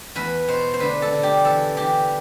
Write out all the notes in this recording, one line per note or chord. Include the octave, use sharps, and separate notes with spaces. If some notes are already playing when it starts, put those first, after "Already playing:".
E2 B4
B2 C5
C5
D3 B4
A4
D3
G4
E3 A4
E3 G4